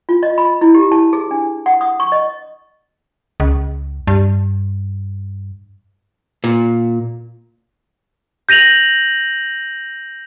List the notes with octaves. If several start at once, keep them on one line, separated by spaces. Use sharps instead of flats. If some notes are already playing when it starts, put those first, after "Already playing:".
F4
D#5
B5
E4
G4
A5
G#4
D4
F#5
D#6
C#6
D#5
C#2
G2
A#2
G6 A#6 D#7 F7 F#7